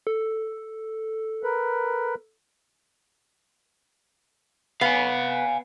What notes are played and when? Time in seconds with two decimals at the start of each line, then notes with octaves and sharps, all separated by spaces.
0.07 A4
1.43 A#4 B4
4.81 B3 F5 G#5